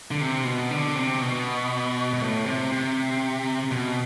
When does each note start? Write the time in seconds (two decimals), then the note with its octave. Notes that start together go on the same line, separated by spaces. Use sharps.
0.11 D3
0.21 C3
0.45 B2
0.71 D3
0.96 C3
1.21 B2
2.13 B2
2.21 A2
2.46 C3
2.72 C3
3.71 B2